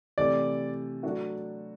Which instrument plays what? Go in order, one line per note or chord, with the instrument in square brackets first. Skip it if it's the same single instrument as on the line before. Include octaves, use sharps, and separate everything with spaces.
[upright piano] C3 E3 A3 [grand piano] D5
[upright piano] F#3 A3 D4 F#4